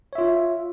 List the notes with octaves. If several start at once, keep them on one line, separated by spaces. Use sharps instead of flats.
F4 C#5 E5